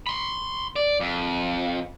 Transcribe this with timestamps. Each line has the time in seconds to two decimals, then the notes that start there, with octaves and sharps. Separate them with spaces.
0.07 B5 C6
0.76 D5
1.00 F2